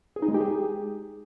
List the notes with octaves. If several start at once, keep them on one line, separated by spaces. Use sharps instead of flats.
G#4
D#4
G#3
G4
G#4